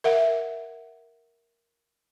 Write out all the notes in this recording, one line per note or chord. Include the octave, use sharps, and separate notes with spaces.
A#4 E5 F#5